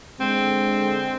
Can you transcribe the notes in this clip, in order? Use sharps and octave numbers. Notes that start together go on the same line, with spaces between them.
D3 G#3 C4